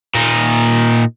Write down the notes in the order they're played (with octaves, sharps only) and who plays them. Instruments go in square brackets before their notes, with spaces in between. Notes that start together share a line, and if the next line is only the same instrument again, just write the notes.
[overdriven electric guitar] A#2 D#4